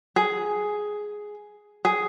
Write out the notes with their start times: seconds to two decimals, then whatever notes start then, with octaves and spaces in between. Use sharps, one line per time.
0.16 G#4
1.85 G#4